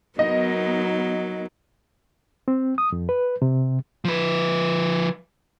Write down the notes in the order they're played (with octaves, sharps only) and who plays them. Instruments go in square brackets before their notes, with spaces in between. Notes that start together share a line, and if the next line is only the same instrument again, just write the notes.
[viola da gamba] F#3 [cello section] B3 D#4 A#4 [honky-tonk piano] D#5
[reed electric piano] C4
D#6
F2
B4
C3
[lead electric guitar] F3 B4